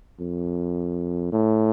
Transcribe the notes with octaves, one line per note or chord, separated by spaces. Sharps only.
F2
A2